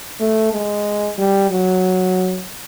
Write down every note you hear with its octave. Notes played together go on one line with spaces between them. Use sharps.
A3
G#3
G3
F#3